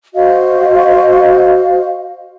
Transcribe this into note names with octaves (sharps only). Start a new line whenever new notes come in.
F#4 C5 D#5 F5